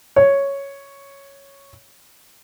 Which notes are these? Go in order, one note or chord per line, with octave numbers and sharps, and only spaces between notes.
C#5